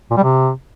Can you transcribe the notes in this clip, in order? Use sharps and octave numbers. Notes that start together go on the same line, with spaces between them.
A#2
G3
C3